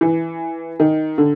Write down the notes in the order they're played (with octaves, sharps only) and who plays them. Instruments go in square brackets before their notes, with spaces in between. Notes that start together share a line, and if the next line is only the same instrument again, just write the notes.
[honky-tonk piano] E3
D#3
D3